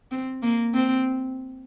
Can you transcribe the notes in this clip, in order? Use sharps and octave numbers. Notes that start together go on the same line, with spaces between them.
C4
A#3
C4